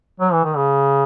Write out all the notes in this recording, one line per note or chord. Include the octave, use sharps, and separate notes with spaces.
F#3
E3
D#3
C#3